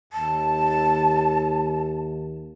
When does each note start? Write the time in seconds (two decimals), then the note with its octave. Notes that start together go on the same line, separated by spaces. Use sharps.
0.13 D#2 A5